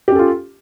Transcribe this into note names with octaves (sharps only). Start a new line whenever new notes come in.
C#4 F4 G4 A4